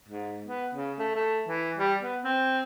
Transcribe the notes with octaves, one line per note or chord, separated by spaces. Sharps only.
G#2
B3
C#3
A3
A3
E3
G3
B3
C4